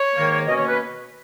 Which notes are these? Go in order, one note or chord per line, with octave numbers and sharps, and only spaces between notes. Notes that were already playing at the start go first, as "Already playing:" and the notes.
Already playing: C#5
G#2 D#3 A#3
B2 A#3 C#4 D#5
C#5
B4